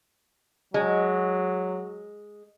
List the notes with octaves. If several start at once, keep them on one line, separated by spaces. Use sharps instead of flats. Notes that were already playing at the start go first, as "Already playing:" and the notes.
F#3 G#3